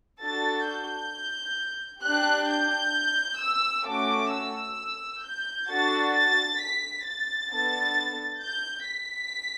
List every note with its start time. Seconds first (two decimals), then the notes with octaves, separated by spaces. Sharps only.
0.21 D4 F#4 A4 A6
0.67 G6
2.03 D4 G4 F#6
2.49 G6
3.40 E6
3.86 A3 C#4 F#4 A4 D6
4.31 E6
5.23 G6
5.68 D4 F#4 A4 A6
6.13 A6
6.60 B6
7.05 A6
7.51 B3 D4 A4
8.42 G6
8.87 B6